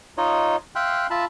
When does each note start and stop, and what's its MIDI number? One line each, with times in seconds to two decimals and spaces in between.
0.18 0.56 63
0.18 0.56 65
0.18 0.56 73
0.18 0.56 75
0.76 1.07 76
0.76 1.07 77
0.76 1.07 79
0.76 1.07 84
0.76 1.07 90
1.10 1.25 65
1.10 1.25 76
1.10 1.25 81
1.10 1.25 83